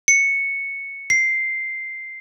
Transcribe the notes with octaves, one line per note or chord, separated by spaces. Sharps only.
C#7
C7